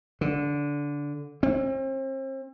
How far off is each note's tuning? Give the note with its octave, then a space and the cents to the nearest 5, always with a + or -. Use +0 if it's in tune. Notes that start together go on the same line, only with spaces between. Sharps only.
D3 -15
C4 +40